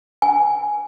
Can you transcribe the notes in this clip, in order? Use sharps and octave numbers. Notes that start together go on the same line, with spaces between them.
G#5